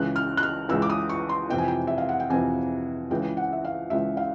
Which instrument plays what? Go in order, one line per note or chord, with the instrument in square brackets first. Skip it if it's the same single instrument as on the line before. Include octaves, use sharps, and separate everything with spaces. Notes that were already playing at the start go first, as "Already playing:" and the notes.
Already playing: [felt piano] C#2 C#3 E3 F#6
F6
F#6
F6
C#2 C#3 E3 E6
D6
D#6
C#6
C6
F2 C3 E3 G5
G#5
G5
E5
F5
F#5
G5
F2 C3 E3 G#5
C#2 C#3 E3 G5
F#5
E5
F5
C#2 C#3 E3 E5
F5